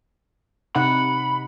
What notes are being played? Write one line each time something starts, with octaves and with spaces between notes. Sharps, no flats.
C3 D#4 F#5 B5